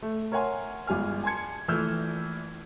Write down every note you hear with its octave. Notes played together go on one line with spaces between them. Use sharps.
A3
A#4 C#5 E5 F#5 G#5 C6
G1 G#3 G#5 F6
G#5 A5 C6 G#6 C#7
A#1 E3 A3 E6 F6 G6